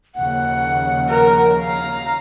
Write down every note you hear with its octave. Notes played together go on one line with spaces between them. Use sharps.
D#2 C#3 F3 F#5
A#4
F5 A#5